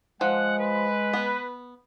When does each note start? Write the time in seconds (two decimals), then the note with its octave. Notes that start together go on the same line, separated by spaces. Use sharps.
0.21 F3 G#3 F#5
0.58 B4
1.13 B3